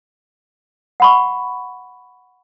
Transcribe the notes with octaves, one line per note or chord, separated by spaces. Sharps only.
F#5 B5 C#6